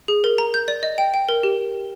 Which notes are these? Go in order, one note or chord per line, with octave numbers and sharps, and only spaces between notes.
G#4
A#4
A#5
G6
D5
D#5
G5
G5
A#4
G4